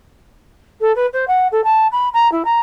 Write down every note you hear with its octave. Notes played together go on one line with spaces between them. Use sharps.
A4
B4
C5
F#5
A4
A5
B5
A#5
E4
A#5